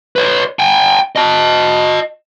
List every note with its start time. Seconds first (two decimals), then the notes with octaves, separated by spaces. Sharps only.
0.16 B4 C#5
0.59 G5 G#5
1.16 D#5 A5